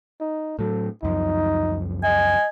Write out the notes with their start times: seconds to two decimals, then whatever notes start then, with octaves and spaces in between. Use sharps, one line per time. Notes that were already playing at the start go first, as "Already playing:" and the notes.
0.20 D#4
0.59 A2 F#3 A4
1.03 C#2 F#2 F3 D#4
2.03 D#5 G#5